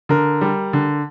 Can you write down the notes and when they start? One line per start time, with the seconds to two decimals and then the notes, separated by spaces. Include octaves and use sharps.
0.09 D3 A#4
0.41 G3
0.73 D3